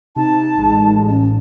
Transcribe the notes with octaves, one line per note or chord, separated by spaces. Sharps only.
C3 D#4 A5
A1 G#3
C#4